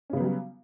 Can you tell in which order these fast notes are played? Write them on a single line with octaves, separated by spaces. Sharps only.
C#4 C#3 B3 F#3 G3